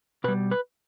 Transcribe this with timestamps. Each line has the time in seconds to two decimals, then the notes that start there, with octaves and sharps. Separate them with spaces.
0.24 B2 B4
0.28 G3
0.51 B4